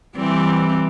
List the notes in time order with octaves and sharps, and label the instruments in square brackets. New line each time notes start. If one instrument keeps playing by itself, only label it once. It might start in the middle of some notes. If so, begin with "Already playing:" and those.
[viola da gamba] E3 G3 C4